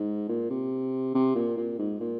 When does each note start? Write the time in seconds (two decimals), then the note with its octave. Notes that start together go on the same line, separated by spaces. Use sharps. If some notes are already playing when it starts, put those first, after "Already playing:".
Already playing: G#2
0.29 A#2
0.50 C3
1.15 C3
1.36 A#2
1.57 A#2
1.79 G#2
2.00 A#2